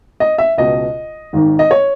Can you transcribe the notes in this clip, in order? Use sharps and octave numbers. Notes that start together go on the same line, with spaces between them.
D#5
E5
C#2 B2 D#5
G#1 G#2 D#3
D#5
C#5